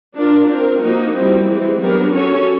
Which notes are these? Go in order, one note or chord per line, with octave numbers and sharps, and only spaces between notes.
D4 F4 A#4
C4 F4 A#4
F3 A#3 D#4 F#4
G3 C4 E4
E3 G#3 C4
F#3 B3 D4 G4 A#4
C#4 F#4 A4 C#5